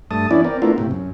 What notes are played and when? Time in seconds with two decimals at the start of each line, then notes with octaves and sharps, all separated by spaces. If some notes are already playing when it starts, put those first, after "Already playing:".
0.11 G2 A3 A5 D#6
0.31 E3 B3 C#4 D4 E4 D5
0.45 C4 A#4 D5
0.62 A3 B3 D4 E4 F4 A#4
0.78 A2 C3
0.91 F#2